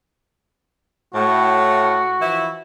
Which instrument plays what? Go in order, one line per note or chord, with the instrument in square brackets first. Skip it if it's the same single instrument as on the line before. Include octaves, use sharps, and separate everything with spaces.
[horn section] A2 [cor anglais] F#4
[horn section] E3 F3 E4